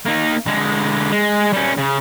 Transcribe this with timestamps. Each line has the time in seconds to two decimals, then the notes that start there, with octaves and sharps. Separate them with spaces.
0.06 A#3 D#4
0.46 D3 G#3
1.12 G#3
1.53 G3 C#4
1.78 C#3